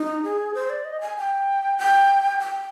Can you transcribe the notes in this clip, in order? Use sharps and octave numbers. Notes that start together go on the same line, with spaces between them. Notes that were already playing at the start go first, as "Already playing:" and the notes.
Already playing: D#4
G#4
C5
D5
D#5
G#5
G5
G5
G5